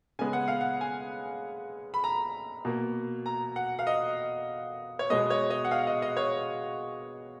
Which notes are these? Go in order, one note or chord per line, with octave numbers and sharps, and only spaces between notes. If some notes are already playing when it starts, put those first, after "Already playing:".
C#3 G#3 B3 G#5
F#5
F5
F#5
G#5
B5
A#5
B2 A#3
A#5
F#5
F5
D#5
C#5
B2 G#3 B3 D#5
C#5
D#5
F#5
F5
D#5
D#5
C#5